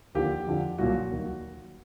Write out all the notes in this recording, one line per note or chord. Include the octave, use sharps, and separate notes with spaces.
D#2 D3 F3 G4
F2 D3 F3
C2 A#2 F#3 F#4
D#2 D#3 F#3